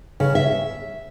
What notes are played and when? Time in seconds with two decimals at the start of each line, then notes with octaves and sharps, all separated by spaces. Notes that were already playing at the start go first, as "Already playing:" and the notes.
0.20 C#3
0.35 E5